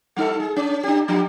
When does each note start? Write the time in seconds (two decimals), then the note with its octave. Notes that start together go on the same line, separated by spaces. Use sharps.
0.16 G3 D#4 A4
0.40 G#4
0.56 C#4
0.83 D4 G4
1.08 F3 D4 G4